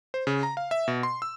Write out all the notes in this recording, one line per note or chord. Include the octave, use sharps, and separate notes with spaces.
C5
C#3
A#5
F5
E5
B2
C6
E6